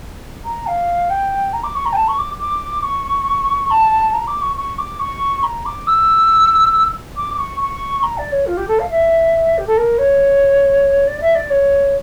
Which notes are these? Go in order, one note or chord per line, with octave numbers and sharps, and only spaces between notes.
A#5
F5
G5
A#5
D6
C#6
A#5
G5
A5
C#6
D6
D6
C#6
A5
A#5
D6
C#6
C#6
D6
C#6
A#5
D6
E6
D6
D6
C#6
C#6
A#5
D5
C#5
F4
G4
A4
F5
E5
G4
A4
A#4
C#5
D5
E5
D5
C#5